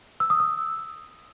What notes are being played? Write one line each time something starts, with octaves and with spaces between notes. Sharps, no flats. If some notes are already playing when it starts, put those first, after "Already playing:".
E6
D#6
E6